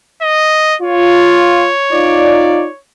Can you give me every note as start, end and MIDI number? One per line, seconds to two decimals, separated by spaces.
0.22 0.76 75
0.82 1.71 65
0.82 2.79 73
1.92 2.67 63
1.92 2.67 65
1.92 2.67 74